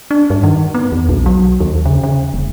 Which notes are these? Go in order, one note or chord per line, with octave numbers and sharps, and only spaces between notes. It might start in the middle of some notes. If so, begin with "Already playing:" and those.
D4
G2
D#3
B3
E2
B1
F#3
D#2
C#3
C#3
E1